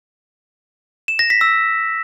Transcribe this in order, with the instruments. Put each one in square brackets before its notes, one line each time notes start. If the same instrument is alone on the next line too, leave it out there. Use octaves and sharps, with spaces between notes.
[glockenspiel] E7
A#6
B6
E6